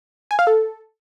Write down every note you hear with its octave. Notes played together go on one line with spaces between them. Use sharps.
G#5
F5
A4